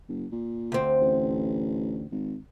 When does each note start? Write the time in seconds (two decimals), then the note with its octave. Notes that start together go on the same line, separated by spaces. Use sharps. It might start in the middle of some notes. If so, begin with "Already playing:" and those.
0.09 F#1
0.32 A#2
0.72 D2 C4
1.01 A1
2.11 G#1